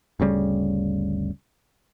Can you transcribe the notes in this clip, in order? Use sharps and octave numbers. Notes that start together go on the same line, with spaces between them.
G1 D2 C#3 G3